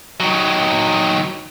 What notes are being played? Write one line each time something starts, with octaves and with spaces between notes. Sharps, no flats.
D#3 F#3